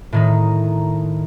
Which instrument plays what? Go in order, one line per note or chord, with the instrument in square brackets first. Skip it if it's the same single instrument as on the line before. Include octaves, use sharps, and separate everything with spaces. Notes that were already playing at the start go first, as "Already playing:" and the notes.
[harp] A2 D#3 D#4